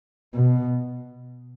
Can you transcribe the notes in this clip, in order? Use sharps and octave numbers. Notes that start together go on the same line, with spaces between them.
B2